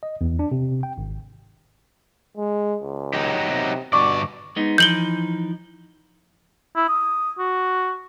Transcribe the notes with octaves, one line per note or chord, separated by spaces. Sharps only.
D#5
E2
D4
C3
G5
G#1
G#3
C#2
F#3 D#4 G4
C3
G2 B2 D3 D5 C#6 D6
G#3 B3 D#4
E3 F3 D#4 G6 F#7 G7
E4
D#6
F#4